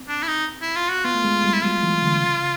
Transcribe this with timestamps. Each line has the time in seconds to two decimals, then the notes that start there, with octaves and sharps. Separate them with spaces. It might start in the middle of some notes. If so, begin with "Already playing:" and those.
Already playing: C4
0.08 D4
0.23 E4
0.28 D#4
0.62 E4
0.76 F4
0.91 F#4
1.05 B3 F4
1.15 A3
1.25 G#3
1.44 G3
1.53 E4
1.63 F#3 F4
1.83 E3
2.02 D3
2.21 C#3